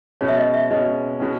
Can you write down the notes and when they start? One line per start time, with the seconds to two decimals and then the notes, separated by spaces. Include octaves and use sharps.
0.21 B2 G#3 C#4 C#5
0.28 E5
0.37 D#5
0.53 E5
0.71 B2 G#3 C#4 D#5
1.20 B2 G#3 C#4